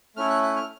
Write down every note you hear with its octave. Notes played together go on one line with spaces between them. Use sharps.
A3 C#4 E4 F6
F#6
F#6
F6